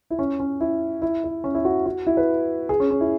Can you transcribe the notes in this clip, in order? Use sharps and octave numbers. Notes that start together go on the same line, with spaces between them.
E4
C#4
C#4
E4
E4
E4
C#4
E4
F#4
F#4
E4
B4
G#4
C#4
C#4
E4